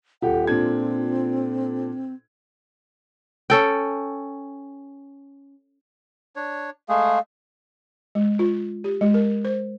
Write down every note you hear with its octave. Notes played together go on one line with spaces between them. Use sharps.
D#1 F4 G4 A4 F#5
A#2 C4 D4 G#6
C#4 A4 G5
D4 C#5
G#3 A3 G#4 F5
G#3
F4
G4
G#3
A#4
C5